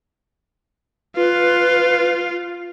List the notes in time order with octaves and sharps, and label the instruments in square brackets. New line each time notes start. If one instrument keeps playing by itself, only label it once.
[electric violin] F4 [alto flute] B4